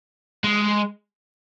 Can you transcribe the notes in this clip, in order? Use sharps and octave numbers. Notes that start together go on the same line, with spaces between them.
G#3